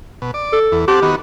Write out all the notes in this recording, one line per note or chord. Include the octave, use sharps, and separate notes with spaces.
B2
D5
A4
E2
C4 G4 A4 F#5
D#3 B3 F#4